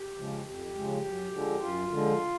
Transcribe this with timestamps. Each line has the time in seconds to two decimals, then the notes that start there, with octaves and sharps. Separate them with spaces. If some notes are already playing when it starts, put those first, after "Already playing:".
Already playing: G4
0.18 C#3 F3 G#3
0.47 F2 G4
0.75 C#3 F3 G#3
1.04 F#2
1.33 D3 F3 G#3
1.61 F#2 F4
1.90 D3 F3 G#3